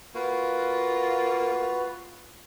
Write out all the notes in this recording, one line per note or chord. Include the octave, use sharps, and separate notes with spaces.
A#3 F4 F#4 B4